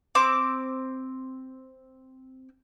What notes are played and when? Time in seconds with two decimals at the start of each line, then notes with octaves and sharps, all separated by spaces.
0.15 C4 D6